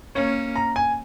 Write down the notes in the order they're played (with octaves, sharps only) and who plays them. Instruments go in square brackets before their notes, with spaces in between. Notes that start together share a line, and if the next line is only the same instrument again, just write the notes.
[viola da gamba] A#3 C#4 [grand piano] C#5
[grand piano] A#5
G#5